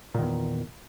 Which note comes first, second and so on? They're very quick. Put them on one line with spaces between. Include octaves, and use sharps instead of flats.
A#2 D#3 E2